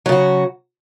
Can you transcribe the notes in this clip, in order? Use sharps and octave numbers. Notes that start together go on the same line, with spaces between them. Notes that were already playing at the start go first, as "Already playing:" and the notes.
C#3 F#3 F#4